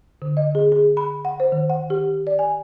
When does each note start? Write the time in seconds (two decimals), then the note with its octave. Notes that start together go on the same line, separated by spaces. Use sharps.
0.22 D3
0.37 D#5
0.55 G#4
0.72 G#4
0.97 B5
1.25 F#5
1.40 C5
1.52 D#3
1.70 F#5
1.90 G4
2.27 D5
2.39 G#5